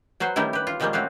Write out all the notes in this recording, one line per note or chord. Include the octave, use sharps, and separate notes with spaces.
F#3 F#4 B4 C5
D#3 G3 A3 C#4 D#4 E4
G4 B4
F4
A#2 D#3 F3 G3 G#3 A#3
A3 C4 C#4 F#4 F5